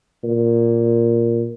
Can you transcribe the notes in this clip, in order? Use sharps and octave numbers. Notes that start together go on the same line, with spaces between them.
A#2